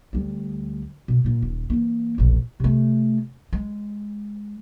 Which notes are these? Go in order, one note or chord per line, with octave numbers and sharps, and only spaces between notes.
D2 G3
B2
A#2 A#3
D#1
E3 A#3
E1 A#1
C3 A3
G#3